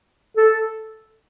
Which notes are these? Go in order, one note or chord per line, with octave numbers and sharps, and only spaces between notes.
A4